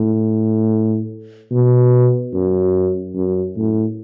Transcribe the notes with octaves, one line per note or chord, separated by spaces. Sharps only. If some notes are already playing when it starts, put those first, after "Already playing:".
Already playing: A2
B2
F#2
F#2
A2